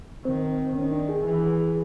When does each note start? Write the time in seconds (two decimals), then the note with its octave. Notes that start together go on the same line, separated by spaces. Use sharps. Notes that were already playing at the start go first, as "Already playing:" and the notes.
0.25 D#3 C4
0.75 D#3 C#4
0.92 D4
1.09 G#4
1.26 E3